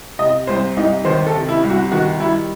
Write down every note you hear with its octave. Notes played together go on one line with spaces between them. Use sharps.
C3 D#5
C2 C5
C2 D#4
D#3 C5
A4
C3
E4
C2
F#4
D#3 F#4
G3 E4